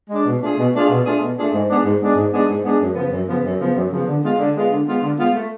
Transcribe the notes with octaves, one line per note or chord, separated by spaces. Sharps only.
G#3 D4
B2
A3 D4 F4 G#4
B2
A3 D4 F4 G#4
B2
A3 D4 F4 G#4
B2
A3 D4 F4 G#4
G#2
G#3 B3 D4 G#4
G#2
G#3 B3 D4 G#4
G#2
G#3 B3 D4 G#4
G#2
G#3 B3 D4 G#4
F#2
C#3 F3 B3
F#2
C#3 F3 B3
F#2
C#3 F3 B3
F#2
C#3 F3 B3
D3
G#3 B3 F4
D3
G#3 B3 F4
D3
G#3 B3 F4
D3
G#3 B3 F4
A3